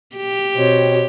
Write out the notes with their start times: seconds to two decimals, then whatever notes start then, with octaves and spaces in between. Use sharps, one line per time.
0.16 G4
0.56 B2 C4 C#5